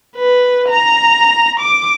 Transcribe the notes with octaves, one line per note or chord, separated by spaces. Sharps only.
B4
A#5
D6